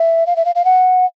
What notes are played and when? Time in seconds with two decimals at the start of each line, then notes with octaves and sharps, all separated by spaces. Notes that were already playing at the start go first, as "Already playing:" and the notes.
Already playing: E5
0.26 F5
0.36 E5
0.45 F5
0.55 F5
0.65 F#5